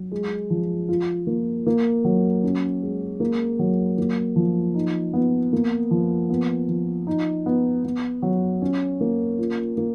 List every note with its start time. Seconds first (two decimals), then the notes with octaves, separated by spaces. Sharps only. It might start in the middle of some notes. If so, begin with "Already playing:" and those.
Already playing: F#3
0.12 G#3
0.50 F3
0.89 F4
1.27 A#3
1.67 A#3
2.04 F#3
2.44 C#4
2.82 G#3
3.20 A#3
3.59 F#3
3.98 A#3
4.36 F3
4.75 D#4
5.14 B3
5.53 A#3
5.91 F3
6.30 B3
6.68 F3
7.07 D#4
7.46 B3
7.84 B3
8.22 F#3
8.62 C#4
9.01 A#3
9.38 F4
9.77 A#3